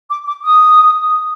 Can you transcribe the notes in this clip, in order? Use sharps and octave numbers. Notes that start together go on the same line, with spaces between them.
D6
D6
D#6